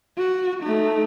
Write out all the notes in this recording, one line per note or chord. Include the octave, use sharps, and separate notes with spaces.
F#4
A3 D#4